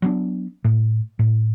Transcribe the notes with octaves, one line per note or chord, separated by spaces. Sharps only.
F#3 B3 D4
A2
A2